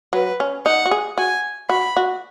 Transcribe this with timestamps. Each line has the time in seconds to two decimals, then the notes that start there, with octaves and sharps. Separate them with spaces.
0.13 F#3 B4
0.40 C#4
0.66 D#4 F#5
0.86 F#4
0.91 G#4
1.18 F#4 G#5
1.69 F#4 B5
1.97 F#4